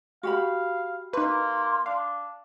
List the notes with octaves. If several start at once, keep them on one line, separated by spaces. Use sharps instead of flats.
F#4 G4 F5 B5
A#3 D#4 B4 C6
D4 F5